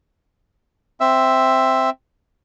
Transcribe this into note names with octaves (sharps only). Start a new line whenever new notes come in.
C4 E5